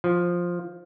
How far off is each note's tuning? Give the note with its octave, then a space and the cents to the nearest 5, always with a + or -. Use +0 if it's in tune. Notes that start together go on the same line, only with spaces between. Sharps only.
F3 +5